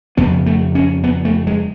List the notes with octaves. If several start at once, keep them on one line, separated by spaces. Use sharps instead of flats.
F2 C#3 B3
A3
C#4
B3
A3
G#3